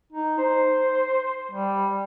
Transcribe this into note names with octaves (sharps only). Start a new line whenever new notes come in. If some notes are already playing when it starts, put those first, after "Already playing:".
D#4
C5
G3